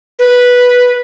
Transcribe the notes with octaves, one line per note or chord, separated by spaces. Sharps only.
B4